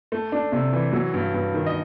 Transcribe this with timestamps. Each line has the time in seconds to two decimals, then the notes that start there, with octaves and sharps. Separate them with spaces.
0.12 A3
0.32 D4
0.52 C3
0.73 E3
0.93 F#3
1.14 G2
1.34 G2
1.54 D#3
1.66 D#5